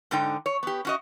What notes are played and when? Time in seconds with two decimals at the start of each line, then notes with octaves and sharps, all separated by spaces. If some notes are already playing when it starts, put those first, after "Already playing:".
0.11 G#2 D3 D#4 G5
0.46 C#5
0.63 B3 G4
0.85 C#4 F#4 D#5